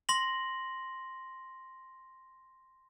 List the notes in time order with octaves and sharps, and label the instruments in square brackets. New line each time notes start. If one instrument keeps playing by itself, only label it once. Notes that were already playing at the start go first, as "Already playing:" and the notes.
[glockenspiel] C6 A#6 F#7